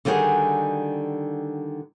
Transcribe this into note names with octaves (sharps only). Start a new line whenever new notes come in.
D3 D#3 G3 F#4 G#4